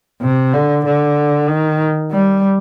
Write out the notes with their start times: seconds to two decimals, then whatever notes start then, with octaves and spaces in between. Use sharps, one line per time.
0.21 C3
0.54 D3
0.85 D3
1.49 D#3
2.12 G3